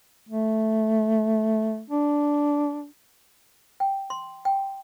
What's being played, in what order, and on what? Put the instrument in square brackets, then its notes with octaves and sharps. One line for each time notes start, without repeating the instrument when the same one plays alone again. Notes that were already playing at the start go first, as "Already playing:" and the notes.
[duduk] A3
D4
[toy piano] G5
C6
G5